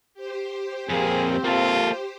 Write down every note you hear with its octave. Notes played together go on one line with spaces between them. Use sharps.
G4 C5
F2 A#3 C4 G#4
A#3 F4 A4